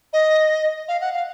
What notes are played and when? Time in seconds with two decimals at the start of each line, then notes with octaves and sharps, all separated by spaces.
0.13 D#5
0.88 F5
1.01 F#5
1.13 F5